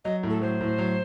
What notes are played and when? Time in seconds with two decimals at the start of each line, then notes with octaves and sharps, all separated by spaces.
0.05 F#3 D#5
0.23 A2
0.30 A4
0.42 F#3 C5
0.60 A2
0.78 F#3